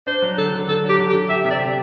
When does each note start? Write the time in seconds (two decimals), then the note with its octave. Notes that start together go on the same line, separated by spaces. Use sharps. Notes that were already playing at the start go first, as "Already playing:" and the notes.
0.07 D4 C5
0.22 F#3
0.38 D3 A4
0.53 D3
0.68 D3 A4
0.84 F#3
0.89 G4
0.99 D3
1.10 G4
1.15 D3
1.29 G4 E5
1.45 C3 E5
1.50 D5
1.61 G4